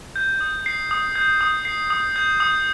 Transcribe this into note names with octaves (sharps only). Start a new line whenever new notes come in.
G6
D#6
C7
D#6
G6
D#6
C7
D#6
G6
D#6